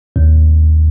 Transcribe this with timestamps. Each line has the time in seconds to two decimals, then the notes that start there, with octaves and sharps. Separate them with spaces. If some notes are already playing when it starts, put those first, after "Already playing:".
0.16 D#2